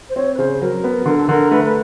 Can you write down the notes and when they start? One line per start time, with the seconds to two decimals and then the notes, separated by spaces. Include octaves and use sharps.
0.09 C5
0.16 C4 C#5
0.34 B4
0.38 C#3 C5
0.61 F#3 A#4
0.84 B3
1.06 D3 A#4
1.17 A4
1.29 D3 A#4
1.51 A3 B4
1.64 B4